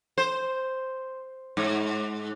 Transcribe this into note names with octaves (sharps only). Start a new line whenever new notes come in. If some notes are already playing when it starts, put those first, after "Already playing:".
C5
G#2